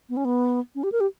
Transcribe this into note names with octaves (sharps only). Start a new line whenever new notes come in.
B3
C#4
B3
C#4
G4
A#4
G4